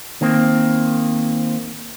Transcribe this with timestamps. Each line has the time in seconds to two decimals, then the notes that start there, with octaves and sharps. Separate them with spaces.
0.21 D#3 A#3 C4